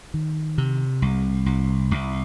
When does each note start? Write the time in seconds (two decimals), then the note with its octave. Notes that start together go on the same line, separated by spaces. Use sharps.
0.14 D#3
0.58 C3
1.02 C2
1.46 C2
1.91 C2